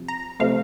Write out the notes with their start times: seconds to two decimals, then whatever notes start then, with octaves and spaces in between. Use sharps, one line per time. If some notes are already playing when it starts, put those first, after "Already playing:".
Already playing: C3 F3
0.08 A#5
0.40 C3 F3 A3 F5